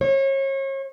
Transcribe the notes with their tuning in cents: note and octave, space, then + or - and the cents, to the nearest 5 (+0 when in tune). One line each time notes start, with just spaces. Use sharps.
C#5 -35